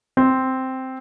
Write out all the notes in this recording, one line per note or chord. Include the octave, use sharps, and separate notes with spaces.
C4